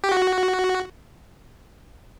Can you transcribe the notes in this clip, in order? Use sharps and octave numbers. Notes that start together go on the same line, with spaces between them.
G4
F#4